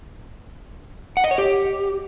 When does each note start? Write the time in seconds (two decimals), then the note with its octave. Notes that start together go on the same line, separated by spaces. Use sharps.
1.17 F#5
1.24 D#5
1.31 C#5
1.38 G4